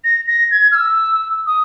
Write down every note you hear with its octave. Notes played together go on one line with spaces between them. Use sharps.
A#6
A#6
G#6
F6
E6
D#6